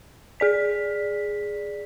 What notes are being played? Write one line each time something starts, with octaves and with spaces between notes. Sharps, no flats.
G#4 D5 B6